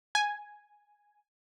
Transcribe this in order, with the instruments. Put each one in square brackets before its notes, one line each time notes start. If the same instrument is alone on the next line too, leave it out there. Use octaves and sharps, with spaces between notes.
[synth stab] G#5